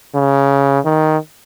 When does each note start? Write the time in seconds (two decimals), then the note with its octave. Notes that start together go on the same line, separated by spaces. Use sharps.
0.15 C#3
0.85 D#3